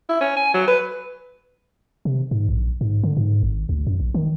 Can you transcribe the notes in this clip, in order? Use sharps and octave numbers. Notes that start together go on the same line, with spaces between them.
E4
C#4
G#5
F#3
B4
C3
G#2
A#1
G#2
D3
G#2
G#1
D2
F#2
A#1
D#3